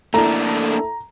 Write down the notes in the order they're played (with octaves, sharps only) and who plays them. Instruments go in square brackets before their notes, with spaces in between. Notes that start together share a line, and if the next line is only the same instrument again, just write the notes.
[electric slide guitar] A3 A#3 D4 [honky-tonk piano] E4 A4 [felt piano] A#5